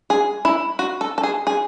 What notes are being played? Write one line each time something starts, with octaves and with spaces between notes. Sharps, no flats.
G#4
E4
F#4
A4
A4
G#4
G#4